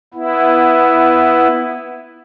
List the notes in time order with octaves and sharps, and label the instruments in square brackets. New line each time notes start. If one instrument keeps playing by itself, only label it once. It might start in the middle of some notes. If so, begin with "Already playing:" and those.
[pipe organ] B3 E4